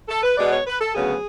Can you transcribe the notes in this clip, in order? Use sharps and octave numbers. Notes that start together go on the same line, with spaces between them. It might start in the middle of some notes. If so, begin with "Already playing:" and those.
A4
B4
B2 G#3 B3 D5
C#5
B4
A4
D2 C#3 F#3 B3 G#4